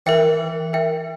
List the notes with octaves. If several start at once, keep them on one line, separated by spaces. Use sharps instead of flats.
E3 A#4 E5 G5
A#4 E5 G5